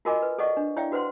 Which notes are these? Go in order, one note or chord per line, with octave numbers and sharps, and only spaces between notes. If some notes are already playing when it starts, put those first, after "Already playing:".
F4 F#4 A#4 D#5 G#5 D6
B4
A4 D5 D#5 F#5 C#6
D4
E4 C#5 D5 E5 F5 G5
F#4 B4 C5 F#5 C6